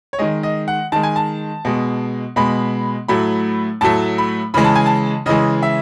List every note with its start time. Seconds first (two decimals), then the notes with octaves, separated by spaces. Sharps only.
0.13 C#5
0.19 D#3 G#3 D#5
0.43 D#5
0.68 F#5
0.92 D#3 G#3 A5
1.03 G#5
1.16 A5
1.65 B2 G#3
2.36 B2 G#3 B5
3.08 A2 F#3 A3 B5
3.81 A2 F#3 A3 A5
4.18 B5
4.54 C#3 E3 G#3 B5
4.64 A5
4.75 G#5
4.86 A5
5.26 C#3 E3 G#3 D#5
5.63 E5